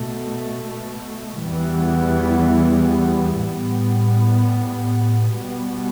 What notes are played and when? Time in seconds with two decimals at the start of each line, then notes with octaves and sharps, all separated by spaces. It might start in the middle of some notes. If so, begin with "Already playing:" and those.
Already playing: B2 A3
1.43 E2 E3 G3 B3
3.39 A2 G3 B3
5.35 B2 G3 B3